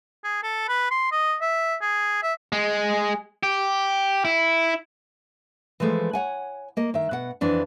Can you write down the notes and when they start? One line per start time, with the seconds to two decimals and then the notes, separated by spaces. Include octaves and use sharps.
0.24 G#4
0.43 A4
0.68 B4
0.91 C6
1.12 D#5
1.42 E5
1.81 G#4
2.23 E5
2.52 G#3
3.43 G4
4.25 E4
5.80 E3 F3 G#3 A3
6.13 C#5 F#5 G#5
6.77 A#3 D#5
6.94 D#3 E5
7.11 B2 F#5
7.41 F2 E3 D4